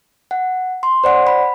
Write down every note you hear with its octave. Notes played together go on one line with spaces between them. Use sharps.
F#5
C6
C5 D5 F#5
B5